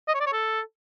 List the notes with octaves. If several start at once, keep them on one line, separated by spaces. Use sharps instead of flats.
D#5
C#5
D5
C#5
A4